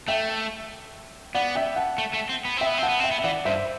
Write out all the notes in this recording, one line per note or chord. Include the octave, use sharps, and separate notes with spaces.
A3 E5 G5
B3 D5 F#5
E5 G5
F#5 A5
A3
A3
C4
B3
C4 E5 G5
B3
C4 F#5 A5
B3
C4 E5 G5
B3
E5
E3 D5 F#5
G2 C5 E5